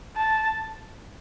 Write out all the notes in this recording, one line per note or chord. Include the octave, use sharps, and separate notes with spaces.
A5